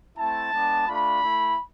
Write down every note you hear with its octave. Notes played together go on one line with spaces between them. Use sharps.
A3 C4 E4 A5
G#3 B3 D4
A3 D4 F4 B5
A3 E4